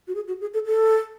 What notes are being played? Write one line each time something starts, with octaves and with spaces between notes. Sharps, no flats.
F#4
G#4
F#4
G#4
A4
A4